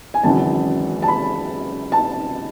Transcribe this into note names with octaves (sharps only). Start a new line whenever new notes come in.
G#5
G#1 F#2 C#3 E3 A5
A5
B5
A5